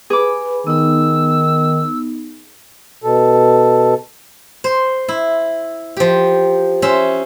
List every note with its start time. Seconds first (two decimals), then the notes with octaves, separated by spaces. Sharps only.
0.10 G#4 B4 B5 D6
0.67 D#3 B3 D#4 E6
3.04 B2 A4
4.64 C5
5.09 E4
5.97 F3 G4
6.82 C#4 C5 E5